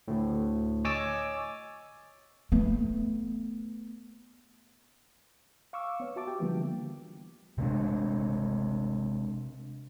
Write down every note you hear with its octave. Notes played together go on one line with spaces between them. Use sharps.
D2 A2
C#5 D#5 G#5 D6 E6 A6
A3 B3
F5 C#6 D6 E6
B3 C#5
F#4 E5 A5 D6
G4 G5
D3 E3 F3 G3 A#3 B3
C3 G#3 D4